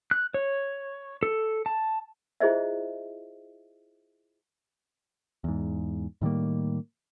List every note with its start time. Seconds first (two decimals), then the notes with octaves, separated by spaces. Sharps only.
0.11 F#6
0.34 C#5
1.23 A4
1.66 A5
2.40 E4 F4 G#4 C5 D#5 E5
5.44 E2 G#2
6.22 A2 D#3 G3 A#3